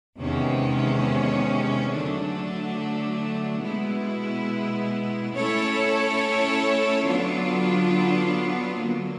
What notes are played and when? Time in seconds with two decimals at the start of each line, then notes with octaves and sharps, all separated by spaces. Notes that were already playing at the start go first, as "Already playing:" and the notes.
0.19 E2 C3 D#3 G#3 C#4
1.91 D3 F#3 A3 D4
3.62 B2 G#3 B3 E4
5.34 A3 C#4 E4 A4 C#5
7.06 D3 F#3 B3 D4 F4
8.78 D3 F#3 A#3